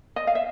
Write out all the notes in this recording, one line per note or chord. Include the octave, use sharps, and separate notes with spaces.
D#5
F5
E5